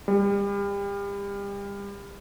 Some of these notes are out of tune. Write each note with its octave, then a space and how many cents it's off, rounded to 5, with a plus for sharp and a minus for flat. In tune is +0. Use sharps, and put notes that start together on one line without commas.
G3 +35